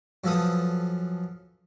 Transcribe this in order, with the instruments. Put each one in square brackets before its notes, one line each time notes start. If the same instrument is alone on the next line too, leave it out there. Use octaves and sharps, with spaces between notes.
[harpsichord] F#2 F3 A4 B4 D#6